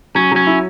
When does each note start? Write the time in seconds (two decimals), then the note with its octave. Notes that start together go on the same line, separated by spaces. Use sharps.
0.15 F#3 C#4
0.32 F#3 C#4
0.46 E4